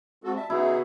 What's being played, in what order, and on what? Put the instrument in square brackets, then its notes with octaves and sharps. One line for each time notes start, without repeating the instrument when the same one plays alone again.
[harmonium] G#3 C4 F4 [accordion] F#4 A4
[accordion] G3 E5 [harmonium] A5
[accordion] C#3 D#4 G#4 [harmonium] B3 F#4 [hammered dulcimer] E4